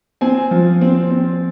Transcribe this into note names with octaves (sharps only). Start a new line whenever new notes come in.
C4 G#5
F3
C4
C4